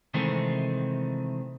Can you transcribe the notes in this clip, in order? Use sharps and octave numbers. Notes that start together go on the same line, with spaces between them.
C3 D#3 E3 G#3 A3 C4